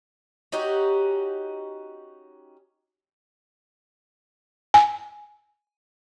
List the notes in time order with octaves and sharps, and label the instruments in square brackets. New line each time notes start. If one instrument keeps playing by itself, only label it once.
[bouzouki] C#4 D#4 F#4 G4
[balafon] G#5